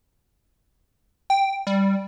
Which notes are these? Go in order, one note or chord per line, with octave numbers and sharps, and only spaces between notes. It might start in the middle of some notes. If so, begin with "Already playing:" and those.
G5
G3